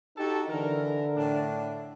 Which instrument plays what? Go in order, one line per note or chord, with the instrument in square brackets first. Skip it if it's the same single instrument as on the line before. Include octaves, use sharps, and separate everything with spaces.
[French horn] D#4 [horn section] F#4 G4 A4
[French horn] D3 [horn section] E3 A#4
[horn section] A2 D4